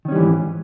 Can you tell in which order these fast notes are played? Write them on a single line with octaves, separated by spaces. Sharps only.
D#3 C#4 G3 E3 G#2